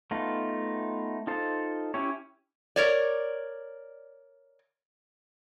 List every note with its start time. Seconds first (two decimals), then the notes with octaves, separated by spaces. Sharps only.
0.11 A3 B3 D#4 F4
1.27 D#4 F4 A4 C5
1.94 C#4 E4 G4 C#5
2.76 A#4 C#5 D5